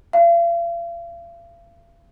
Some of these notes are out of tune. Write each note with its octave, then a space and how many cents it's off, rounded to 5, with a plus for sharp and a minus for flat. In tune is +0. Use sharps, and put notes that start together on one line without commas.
F5 -45